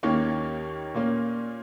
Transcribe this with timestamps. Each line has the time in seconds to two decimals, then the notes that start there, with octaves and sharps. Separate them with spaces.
0.03 D#2 D#3 A#3 C#4 C#5
0.94 A#2 A#3 C#4